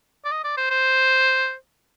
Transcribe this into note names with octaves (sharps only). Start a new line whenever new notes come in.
D5
D#5
D5
C5
C5